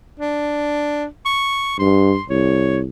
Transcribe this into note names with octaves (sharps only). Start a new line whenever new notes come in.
D4
C#6
G2 C6
C2 C#5